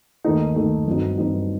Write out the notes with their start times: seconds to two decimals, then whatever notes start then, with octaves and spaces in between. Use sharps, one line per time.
0.25 D#2 D#3 A3 D#4
0.56 D#2 D#3 A3 D#4
0.87 G1 G2 F#3 C4 D#4
1.18 G1 G2 F#3 C4 D#4